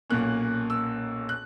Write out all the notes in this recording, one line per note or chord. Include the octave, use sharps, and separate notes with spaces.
B1 A#2 A#3 C#4 F#6
E6
F#6